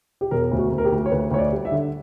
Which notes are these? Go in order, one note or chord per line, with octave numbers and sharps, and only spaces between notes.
G4
E1 A#4
D2
F#4
D2
A#4
G4
D2
C#5
D2 B4
D2 C#5
D5
G3
E5
D3